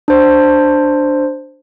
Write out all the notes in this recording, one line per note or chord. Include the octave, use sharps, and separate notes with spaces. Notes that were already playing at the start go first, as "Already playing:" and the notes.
D4 C5